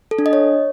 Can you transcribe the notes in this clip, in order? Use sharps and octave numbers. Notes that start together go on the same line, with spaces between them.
A4
D4
D#5
C#5